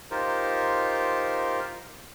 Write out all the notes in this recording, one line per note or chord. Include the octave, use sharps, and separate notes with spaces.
D#4 F4 G4 A#4 C5